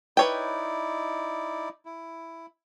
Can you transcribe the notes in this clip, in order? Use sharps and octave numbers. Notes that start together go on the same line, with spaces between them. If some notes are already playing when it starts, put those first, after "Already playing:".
D#4 E4 B4 C#5 D5 G5
E4